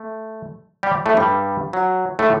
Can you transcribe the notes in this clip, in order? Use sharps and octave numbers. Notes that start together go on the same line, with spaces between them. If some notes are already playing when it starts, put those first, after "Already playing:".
Already playing: A3
G3 G4
A2 A3
G2 G3
F#3
A2 A3